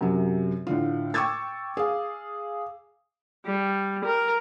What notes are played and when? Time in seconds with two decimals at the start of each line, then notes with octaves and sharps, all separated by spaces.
0.01 F#2 C3 F#3
0.67 A2 D3 F4
1.14 G5 C#6 D6 E6 G#6 A6
1.77 G#4 F5
3.46 G3
4.05 A#4